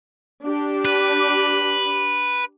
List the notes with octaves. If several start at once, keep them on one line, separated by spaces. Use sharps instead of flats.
D4 G4
B4